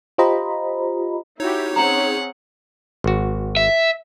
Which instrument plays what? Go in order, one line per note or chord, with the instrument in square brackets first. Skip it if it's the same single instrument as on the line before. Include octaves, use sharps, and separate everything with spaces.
[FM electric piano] F4 G4 C5 D#5 A#5 B5
[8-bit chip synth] D#4 C#5 [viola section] E4 F#4 G4
[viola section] C4 C#4 G#4 [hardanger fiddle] F#5 [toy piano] A#5
[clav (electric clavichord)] G#1 F#4
[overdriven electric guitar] E5